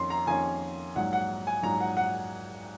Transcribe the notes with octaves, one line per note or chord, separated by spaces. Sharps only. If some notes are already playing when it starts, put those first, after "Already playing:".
Already playing: F2 D#3 A#3 C#4 C6
A#5
F2 D#3 A#3 C#4 G#5
A#1 G#2 F#3 F#5
F#5
G#5
A#1 G#2 F#3 A#5
F#5
F#5